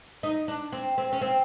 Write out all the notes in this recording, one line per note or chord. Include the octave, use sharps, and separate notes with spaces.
D#4
D4
C4
C4
C#4
C4